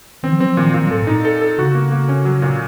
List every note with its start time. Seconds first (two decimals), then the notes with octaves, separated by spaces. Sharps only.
0.23 D#3 C4
0.32 F3
0.40 F#3 C4
0.49 F3
0.57 A#2 D#3
0.66 F3
0.73 A#2 D#3
0.82 F#3
0.91 A2 A4
1.02 A2
1.07 D#4
1.25 A4
1.41 A4
1.58 C#3 F#4
1.75 A#3
1.92 A#3
2.09 C#4
2.25 F#3
2.42 A#2